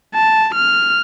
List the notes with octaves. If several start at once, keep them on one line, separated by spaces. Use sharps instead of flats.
A5
F6